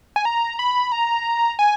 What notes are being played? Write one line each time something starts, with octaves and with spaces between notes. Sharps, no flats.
G#5
A#5
B5
A#5
G#5